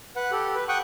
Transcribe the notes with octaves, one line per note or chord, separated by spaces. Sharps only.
B4 F#5
G4 A4
B4
F#5 G5 C#6 D#6